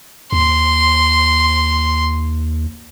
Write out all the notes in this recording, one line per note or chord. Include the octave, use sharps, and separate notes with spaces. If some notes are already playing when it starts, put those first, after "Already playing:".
D#2 C6